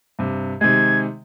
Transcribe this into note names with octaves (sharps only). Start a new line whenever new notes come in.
G2 C3
C3 D#3 G#3 G#6